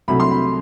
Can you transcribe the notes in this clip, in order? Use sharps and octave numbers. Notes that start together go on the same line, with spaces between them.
C2 C3 F#3 A3 B5
C6
B5